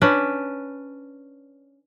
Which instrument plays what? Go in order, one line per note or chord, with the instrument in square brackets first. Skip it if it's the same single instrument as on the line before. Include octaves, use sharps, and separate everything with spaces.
[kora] C#4 D4 B4